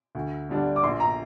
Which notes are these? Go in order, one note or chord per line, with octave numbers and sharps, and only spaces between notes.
D2
D3 G3 D4
D6
A#1 C6
A#5